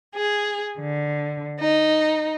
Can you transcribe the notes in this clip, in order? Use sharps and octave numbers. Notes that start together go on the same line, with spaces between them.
G#4
D3
D#4